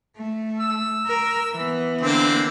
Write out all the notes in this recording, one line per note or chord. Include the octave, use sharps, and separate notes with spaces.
A3
E6
A#4
E3 B3
D3 A#3 C4